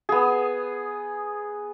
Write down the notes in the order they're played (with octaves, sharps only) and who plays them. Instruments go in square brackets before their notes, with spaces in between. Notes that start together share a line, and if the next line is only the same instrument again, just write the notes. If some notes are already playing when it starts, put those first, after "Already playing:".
[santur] B3 G#4